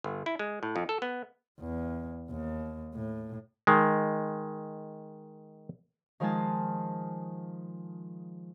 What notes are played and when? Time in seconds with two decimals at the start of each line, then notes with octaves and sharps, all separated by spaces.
0.04 G1
0.26 E4
0.39 G#3
0.63 A2
0.76 F2
0.89 A4
1.02 B3
1.60 E2
2.30 D#2
2.94 A2
3.67 D#3 G#3
6.20 D#3 F3 G#3 F4 G#5 A5